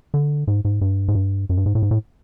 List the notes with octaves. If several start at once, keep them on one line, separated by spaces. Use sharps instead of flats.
D3
G#2
G#2
G2
G#2
G2
F#2
G2
G#2
A2
G#2
A2